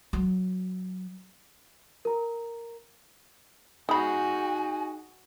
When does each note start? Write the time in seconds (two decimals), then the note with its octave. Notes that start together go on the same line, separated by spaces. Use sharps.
0.13 F#3
2.05 A#4 A#5
3.89 B3 D#4 F#4 G#4 G#5 B5